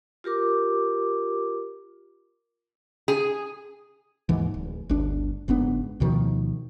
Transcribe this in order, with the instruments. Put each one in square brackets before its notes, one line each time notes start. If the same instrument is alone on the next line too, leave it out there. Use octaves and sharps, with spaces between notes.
[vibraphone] F4 G4 A#4 D6
[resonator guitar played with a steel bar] G#4
[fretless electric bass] D#2 G#2 E3
D1
G1 D2 D4
F#1 G#2 B3 D4
D2 B2 D#3 F3